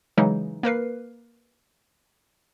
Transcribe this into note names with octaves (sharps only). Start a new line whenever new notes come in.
C#3 E3 F#3 G#3 D#4
A#3 A#4 B4 C7